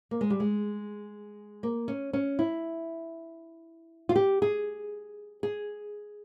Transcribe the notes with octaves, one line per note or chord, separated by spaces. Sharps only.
A#3
G#3
G3
G#3
A#3
C#4
C#4
E4
F4
G4
G#4
G#4